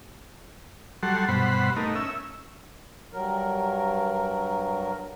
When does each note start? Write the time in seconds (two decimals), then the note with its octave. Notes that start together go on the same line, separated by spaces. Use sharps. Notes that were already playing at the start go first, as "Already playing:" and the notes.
1.03 F#3 G3 A4 F#5 C6
1.29 G2 B2 C5 F#5 B5
1.76 A3 D#4 A#4
1.95 C#4 E5 E6
3.13 G2 F#3 A#4